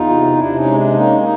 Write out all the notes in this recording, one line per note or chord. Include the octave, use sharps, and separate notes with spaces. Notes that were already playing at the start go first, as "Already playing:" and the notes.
Already playing: E2 D#4 F4
C3
C3 D4 E4
C#4 D#4
G#3
D4
A#3 C#4 D#4
D#4